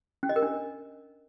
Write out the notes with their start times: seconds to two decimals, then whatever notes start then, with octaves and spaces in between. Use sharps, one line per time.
0.23 C#4
0.29 D#5
0.36 A#4
0.42 D4